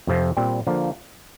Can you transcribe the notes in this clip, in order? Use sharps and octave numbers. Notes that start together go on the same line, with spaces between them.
F2 C3 F3
A#2 G3 C4
D3 F3 A#3